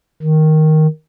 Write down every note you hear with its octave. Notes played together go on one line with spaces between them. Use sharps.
D#3